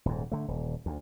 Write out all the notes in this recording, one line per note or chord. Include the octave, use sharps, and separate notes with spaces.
D#1 G#2
D3 A3
D#1
D2